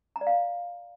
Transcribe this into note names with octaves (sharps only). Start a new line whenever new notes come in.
A#5
D5
F5